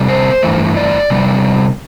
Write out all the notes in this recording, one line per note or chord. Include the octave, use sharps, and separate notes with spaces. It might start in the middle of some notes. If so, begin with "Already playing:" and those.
Already playing: C3 G3 B3
C5
G2 E3 A3
D5
C3 G3 B3